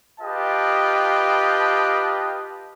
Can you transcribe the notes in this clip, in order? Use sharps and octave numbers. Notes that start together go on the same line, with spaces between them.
F4 G4 B4 D#5 G5 A5